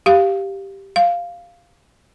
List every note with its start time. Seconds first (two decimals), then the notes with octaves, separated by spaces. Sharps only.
0.06 G4 F5
0.96 F5